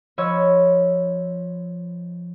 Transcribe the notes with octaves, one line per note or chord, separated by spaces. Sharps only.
F3 C#5 D#5 B5 C#6 E6